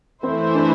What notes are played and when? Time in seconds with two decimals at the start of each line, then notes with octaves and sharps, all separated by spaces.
0.23 E3 A3 C4 E4 C5
0.55 D4